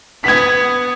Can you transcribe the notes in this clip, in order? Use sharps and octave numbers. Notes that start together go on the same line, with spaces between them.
B3 G#6 B6